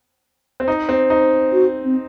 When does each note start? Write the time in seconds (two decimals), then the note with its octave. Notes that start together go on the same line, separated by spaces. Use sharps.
0.60 C4
0.68 D#4
0.89 C4
1.10 D#4
1.52 F#4
1.84 C4